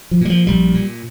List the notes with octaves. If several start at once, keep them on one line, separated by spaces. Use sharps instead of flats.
F3
A#2 G3
F3
A#1 G3
A#2